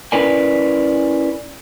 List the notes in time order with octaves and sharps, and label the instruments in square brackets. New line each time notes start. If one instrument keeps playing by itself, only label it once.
[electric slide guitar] C#4 E4 A#4 B4 D5 G#5